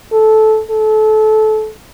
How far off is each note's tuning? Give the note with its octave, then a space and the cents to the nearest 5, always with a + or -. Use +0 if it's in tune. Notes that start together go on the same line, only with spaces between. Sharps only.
A4 -15
A4 -25